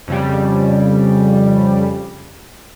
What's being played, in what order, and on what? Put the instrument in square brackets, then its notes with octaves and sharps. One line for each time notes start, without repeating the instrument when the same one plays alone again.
[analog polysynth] F2 C#3 G3